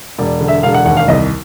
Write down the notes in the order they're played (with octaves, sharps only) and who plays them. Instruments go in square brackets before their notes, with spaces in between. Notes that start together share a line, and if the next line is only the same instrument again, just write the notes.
[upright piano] E1 D5
D3
E5
E1 F5
F#5
D#2 F#5
F5
C2 D#5